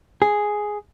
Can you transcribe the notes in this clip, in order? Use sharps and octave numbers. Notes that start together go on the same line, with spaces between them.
G#4